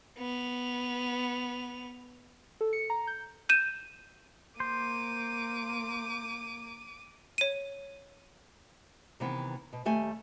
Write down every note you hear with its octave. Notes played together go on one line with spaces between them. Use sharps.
B3 F7
A4
C#7
A#5
G6
G6 D#7 E7
A#3 C5 D6 D#7
C#5 D#7
C3 D#3 E3 B3
B2
D#2 G3 A3 G4 G#5